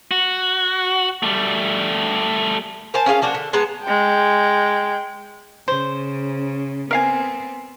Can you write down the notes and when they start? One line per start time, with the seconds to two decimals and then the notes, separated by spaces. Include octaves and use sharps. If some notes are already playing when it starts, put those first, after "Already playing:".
0.11 F#4
1.23 G3 A3
2.94 A#4 C5 G#5 A5
3.06 C#4 F4 G#4 F5
3.22 F3 A#3 D4 F#4
3.34 D3
3.53 G#3 B3 A5 A#5
3.83 G#3 G5
5.68 C#3 C5
6.91 B3 C4 A#4 F5 G#5